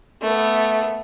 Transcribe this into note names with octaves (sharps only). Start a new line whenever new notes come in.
A3 B3